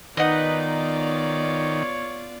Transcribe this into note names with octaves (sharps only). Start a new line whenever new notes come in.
D#3 B3 D#4 F4 B4 D5 F#5
C#5